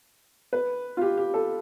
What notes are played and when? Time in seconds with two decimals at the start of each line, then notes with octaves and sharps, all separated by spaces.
0.53 B4
0.97 F4
1.01 G4
1.17 G4
1.34 A4